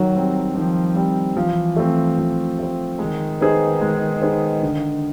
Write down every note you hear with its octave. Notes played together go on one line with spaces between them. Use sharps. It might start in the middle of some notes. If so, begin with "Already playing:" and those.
Already playing: D#3 F#3
G3 C4
D#3 F3
G3 C4
E3 F3
A3 C4
F3
A3 C4
D#3 G#3
B3 D#4 G#4 C5
G#3
B3 D#4 G#4 C5
D3